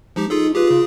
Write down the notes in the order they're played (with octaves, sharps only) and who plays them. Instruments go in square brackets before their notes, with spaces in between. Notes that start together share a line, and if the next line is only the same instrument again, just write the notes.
[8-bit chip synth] F3 D#4 G4 [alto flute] G#3
[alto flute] D#4 [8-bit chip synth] F4 G#4 A4
[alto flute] F4 [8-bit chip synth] G4 G#4 B4
[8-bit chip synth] C#3 G#4